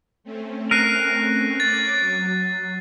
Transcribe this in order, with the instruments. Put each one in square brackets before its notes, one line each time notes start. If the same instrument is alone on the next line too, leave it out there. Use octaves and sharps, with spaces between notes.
[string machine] A3 C4 C#4
[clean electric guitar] A#4 [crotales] F#6 C7 D#7
[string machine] C#5 D6 [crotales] A6
[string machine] F#3